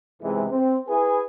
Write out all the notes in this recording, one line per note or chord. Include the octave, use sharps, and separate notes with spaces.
C#2 G#2 C3 E3 G#3
C4
E4 G#4 B4 G#5